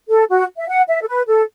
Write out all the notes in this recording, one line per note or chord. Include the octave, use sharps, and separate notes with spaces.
A4
F#4
E5
F#5
E5
A4
B4
A4